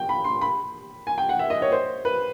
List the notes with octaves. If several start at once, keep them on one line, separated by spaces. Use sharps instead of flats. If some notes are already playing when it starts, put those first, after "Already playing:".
Already playing: G5
B5
C6
B5
G#5
G5
F#5
E5
D#5
C#5
C5
B4